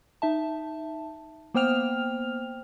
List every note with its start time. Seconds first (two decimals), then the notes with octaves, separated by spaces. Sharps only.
0.22 D#4 E5 A5
1.54 A#3 B3 C5 G5 F6 F7